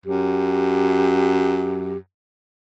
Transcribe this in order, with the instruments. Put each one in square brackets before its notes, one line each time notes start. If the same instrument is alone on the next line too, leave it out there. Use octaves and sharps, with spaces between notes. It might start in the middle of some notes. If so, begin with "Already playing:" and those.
[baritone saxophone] F#2 [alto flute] G4